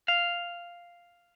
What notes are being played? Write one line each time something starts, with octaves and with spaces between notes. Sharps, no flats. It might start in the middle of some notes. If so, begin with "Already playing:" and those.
F5